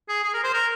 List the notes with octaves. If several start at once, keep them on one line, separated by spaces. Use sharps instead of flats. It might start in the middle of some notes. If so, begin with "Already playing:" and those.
G#4
G#4
A#4
C5
A#4